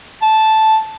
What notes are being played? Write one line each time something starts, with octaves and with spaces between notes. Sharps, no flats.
A5